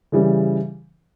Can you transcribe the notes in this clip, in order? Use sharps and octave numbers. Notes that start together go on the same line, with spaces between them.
C#3 E3 G3